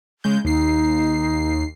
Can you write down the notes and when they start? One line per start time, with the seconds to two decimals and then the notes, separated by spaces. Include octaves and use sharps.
0.24 C#3 G#3 G6
0.45 D#2 D#4 C7